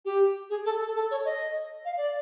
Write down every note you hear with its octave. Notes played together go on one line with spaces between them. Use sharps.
G4
G#4
A4
A4
A4
C#5
D#5
F5
D5